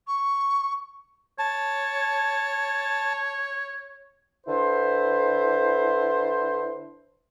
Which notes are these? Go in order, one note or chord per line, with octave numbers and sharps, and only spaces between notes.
C#6
C#5 A5
D3 E4 B4 C5